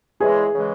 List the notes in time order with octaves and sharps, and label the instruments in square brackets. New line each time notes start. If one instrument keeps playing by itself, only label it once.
[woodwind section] E2 C#3 E3 G#3 [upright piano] G#4
[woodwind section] C#3 E3 G#3